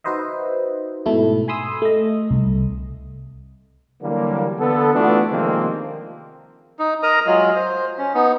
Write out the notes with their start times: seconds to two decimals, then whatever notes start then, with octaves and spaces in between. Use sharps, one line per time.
0.04 D#4 F#4 B4 C5 D#5 E5
1.06 G#2 B2 A3 E4
1.48 G#5 B5 C6 D#6 E6
1.82 A3 D#5
2.31 C2
4.02 D3 E3 F#3 G3 A#3
4.59 D3 B3 A4
4.94 E3 A3 B3 D4 F4 F#4
5.30 C3 D#3 F3 G#3 A#3 C4
6.79 D#4
7.03 A#4 D#5 A#5 D#6
7.27 F#3 G#3 F4
7.55 C5
7.98 C#4
8.15 B3 D#4